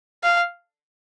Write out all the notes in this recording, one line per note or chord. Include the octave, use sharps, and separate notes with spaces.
F5